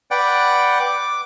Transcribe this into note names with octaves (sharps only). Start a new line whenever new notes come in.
B4 D5 F#5 G5
D6